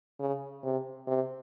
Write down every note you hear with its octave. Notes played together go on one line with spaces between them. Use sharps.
C#3
C3
C3